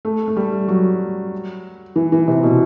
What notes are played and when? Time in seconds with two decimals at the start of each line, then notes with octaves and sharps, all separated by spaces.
0.05 A3
0.28 A3
0.37 G3
0.68 F#3
1.96 E3
2.12 E3
2.28 C3
2.43 B2